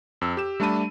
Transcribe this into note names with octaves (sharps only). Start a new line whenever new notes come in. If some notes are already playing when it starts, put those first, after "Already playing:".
F2 E6
G4 E7
G3 A3 D4 A5 B5 D#7